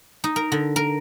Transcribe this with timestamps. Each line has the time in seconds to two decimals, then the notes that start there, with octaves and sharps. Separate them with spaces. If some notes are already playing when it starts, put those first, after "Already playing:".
0.24 D#4
0.36 A#4
0.52 D3
0.76 A#4